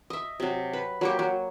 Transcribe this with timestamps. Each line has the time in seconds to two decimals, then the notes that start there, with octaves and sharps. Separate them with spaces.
0.10 D#5 E5
0.40 C3 F#3
0.73 B4
1.01 F#3 A#3 G4
1.19 F#3